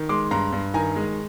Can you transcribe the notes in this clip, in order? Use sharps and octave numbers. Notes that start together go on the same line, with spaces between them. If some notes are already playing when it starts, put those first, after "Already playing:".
Already playing: D#3
G#3 C6 D6
G2 A#5 C6
G2
D#3 G#5 A#5
G#3